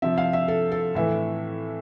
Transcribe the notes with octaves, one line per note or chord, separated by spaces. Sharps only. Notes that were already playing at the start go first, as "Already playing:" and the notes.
C3 F3 E5
F5
E5
A4
A4
A2 E3 E5